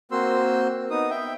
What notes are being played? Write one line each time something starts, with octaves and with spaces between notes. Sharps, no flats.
A#3 C4 F#4 C5 C6 E6
B3 D#4 D#6
E5 G5